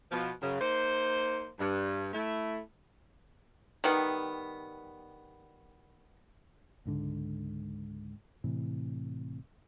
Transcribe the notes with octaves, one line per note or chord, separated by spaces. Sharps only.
B2 F3
F#2 C#3
A#3 D#4 C5
G2
A3 E4
D#3 G3 B3
C#2 G#2 D3
A2 C3 E3